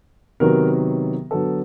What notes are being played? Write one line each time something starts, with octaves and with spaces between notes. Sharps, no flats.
C3 D#3 F#3 B3 A#4
D3 F#3 B3 A4